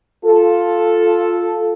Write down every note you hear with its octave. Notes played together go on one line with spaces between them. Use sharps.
F4 A4